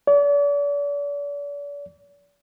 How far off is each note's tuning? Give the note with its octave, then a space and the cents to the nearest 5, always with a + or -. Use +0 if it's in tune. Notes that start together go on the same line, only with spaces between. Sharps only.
D5 -40